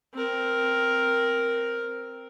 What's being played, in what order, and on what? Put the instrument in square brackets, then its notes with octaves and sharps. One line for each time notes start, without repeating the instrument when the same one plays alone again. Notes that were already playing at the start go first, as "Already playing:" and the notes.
[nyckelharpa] C4 A#4